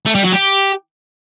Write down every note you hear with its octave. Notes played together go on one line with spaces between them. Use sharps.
A3
G3
F#3
G4